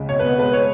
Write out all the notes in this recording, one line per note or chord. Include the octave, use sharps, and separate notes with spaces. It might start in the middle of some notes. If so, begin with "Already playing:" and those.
Already playing: C#2
B2 C#5
B3 B4
G#3 B4
C#5